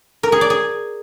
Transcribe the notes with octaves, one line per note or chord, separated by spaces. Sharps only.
A#4
G#4
D5
G#4